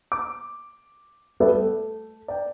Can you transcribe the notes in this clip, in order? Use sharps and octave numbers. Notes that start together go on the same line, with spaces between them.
D6
G3 B3 F#4 A4 B4 E5
A3
D5 G5